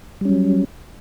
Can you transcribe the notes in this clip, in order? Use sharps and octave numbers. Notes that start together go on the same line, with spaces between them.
F#3 G3 C#4